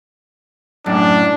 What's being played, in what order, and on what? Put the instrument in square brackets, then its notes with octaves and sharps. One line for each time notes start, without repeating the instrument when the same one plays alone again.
[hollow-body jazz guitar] F#2 A2 [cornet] D4